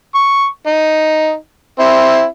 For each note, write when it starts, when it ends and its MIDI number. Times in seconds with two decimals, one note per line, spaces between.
0.15 0.46 85
0.66 1.35 63
1.80 2.25 60
1.80 2.25 64